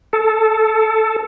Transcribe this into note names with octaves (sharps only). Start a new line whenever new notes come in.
A4